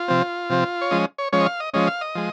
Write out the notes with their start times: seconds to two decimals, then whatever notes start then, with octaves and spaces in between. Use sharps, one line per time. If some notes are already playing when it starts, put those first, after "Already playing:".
Already playing: F4
0.08 C3 F3 C4
0.50 C3 F3 C4
0.81 C#5
0.91 F3 G#3 C#4 D#5
1.18 C#5
1.32 F3 G#3 C#4 C#5
1.41 D#5
1.46 F5
1.60 D#5
1.74 F3 G#3 C#4 D#5
1.88 F5
2.01 D#5
2.15 F3 G#3